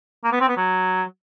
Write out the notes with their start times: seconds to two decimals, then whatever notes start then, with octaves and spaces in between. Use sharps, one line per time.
0.24 A#3
0.32 B3
0.41 C4
0.49 B3
0.57 F#3